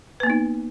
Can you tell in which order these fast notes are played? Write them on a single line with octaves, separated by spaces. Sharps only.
B4 A#3 B3 D#4